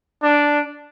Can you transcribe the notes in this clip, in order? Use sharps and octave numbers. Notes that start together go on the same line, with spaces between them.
D4